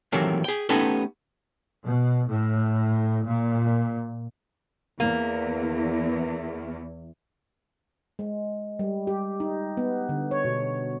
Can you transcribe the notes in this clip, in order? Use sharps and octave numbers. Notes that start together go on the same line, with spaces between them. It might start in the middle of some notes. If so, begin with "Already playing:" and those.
C3 D#3 E3 F#3 A3 A#3
G#4 G5
A3 B3 C#4 D#4 G4 A4
B2
A2
A#2
E2 A#3
G#3
G3
G4
D#4
B3
D3
C#5
B2